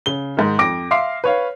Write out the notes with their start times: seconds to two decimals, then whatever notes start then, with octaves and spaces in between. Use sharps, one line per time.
0.06 C#3 G7
0.37 G#2 D#3
0.59 F2 D6 A#6 D7
0.91 E5 F5 C6 D6 C7
1.24 B4 C#5 F5